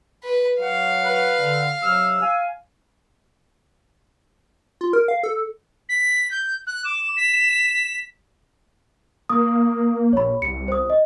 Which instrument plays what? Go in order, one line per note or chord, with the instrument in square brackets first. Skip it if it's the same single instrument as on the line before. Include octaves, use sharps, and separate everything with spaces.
[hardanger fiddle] B4
[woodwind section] F#3 F#5 [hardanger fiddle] F5
[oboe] B4
[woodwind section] D3
[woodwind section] C3 F#3 F6 [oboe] E6
[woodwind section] F5 G#5
[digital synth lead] F4
A#4
F5
A4
[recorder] B6
G6
F#6
[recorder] D6 [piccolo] E7
[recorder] B6
[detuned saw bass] A#3 [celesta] D#6
[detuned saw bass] A#1 [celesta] C#5 B5
[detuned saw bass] C2 [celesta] C#7
[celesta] C5 D#6
D#5